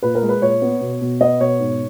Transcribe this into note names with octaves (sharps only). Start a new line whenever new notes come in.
A#2 B4
A#4
G#3
B4
A#2 C#5
B3
B2
B2
B3 D#5
B2 C#5
G#2